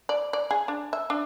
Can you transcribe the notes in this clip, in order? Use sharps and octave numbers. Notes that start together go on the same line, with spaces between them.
D5
D5
G#4
D4
E5
D4